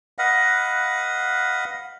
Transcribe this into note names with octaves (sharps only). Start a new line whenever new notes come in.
B4 D#5 F5 F#5